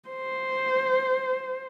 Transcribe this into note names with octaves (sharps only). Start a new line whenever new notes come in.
C5